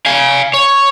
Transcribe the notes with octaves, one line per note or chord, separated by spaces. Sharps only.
F5 G#5
C#5